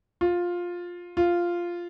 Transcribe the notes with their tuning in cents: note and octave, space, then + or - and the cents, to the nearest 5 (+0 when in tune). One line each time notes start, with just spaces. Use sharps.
F4 +10
F4 -5